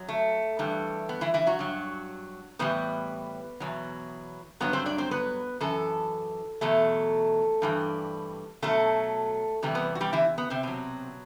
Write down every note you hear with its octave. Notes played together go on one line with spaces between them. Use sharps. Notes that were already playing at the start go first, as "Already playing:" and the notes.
Already playing: F#2 F#3
A3
G2 E3 G3
B3
E3 E4
E3 E4
F#3 F#4
G2 F#3
A2 E3 G3 B3 B4
E2 B2 F#3
G2 F#3 B3 B4
C4 C5
D4 D5
C4 C5
B3 B4
F#2 E3 A4
E2 B2 F#3 A3 A4
G2 E3 G3
B2 F#3 A3 A4
E2 C3 E3 G3
B3 B4
F#4
G3 G4
E3 E4
B3
C3 C4
B2 F#3